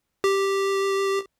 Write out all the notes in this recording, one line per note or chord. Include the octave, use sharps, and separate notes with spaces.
G4